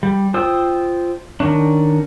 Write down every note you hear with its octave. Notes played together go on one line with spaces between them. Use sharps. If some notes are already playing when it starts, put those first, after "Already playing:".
G3
F4 C5 G5 D#6 E6
D#3 G#3 C#4 D4